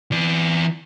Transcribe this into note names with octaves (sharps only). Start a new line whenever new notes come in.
E3 D5